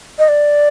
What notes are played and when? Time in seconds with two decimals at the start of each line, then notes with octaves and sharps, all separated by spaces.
0.19 D#5
0.29 D5